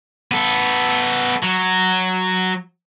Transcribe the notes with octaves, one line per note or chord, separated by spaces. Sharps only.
B3 A4
F#3